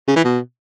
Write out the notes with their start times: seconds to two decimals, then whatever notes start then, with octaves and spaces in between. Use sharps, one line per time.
0.08 C#3
0.16 E3
0.24 B2